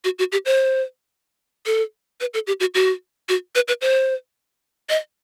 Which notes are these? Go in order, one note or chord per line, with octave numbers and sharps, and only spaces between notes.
F#4
F#4
G4
C5
A4
B4
A4
G4
F#4
F#4
F#4
B4
B4
C5
D#5